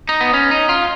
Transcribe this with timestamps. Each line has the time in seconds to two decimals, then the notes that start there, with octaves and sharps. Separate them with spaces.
0.09 D#4
0.21 B3
0.33 C#4
0.51 D#4
0.69 F4